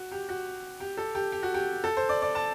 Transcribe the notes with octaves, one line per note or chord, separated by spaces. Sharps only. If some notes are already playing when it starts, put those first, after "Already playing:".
Already playing: F#4
G4
F#4
G4
A4
G4
G4
F#4
G4
A4
C5
D5
D5
A5